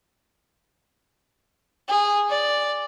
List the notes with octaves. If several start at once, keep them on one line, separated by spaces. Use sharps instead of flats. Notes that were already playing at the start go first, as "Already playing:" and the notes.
G#4
D5